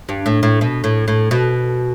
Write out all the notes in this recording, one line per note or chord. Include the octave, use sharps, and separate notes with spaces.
G2
A2
A2
B2
A2
A2
B2